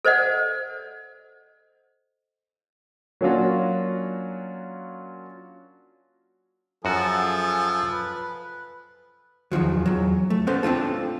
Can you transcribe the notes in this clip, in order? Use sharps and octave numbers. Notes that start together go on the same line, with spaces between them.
A4 C5 D5 D#5 F#5
F#3 A#3 C#4 D4 F4 F#4
F#2 F3 F#4 G#4 A4
B4
E2 D#3 F3 F#3
E2 F#3
A3
B3 C#4 A4 C5
C4 D4 F4 A4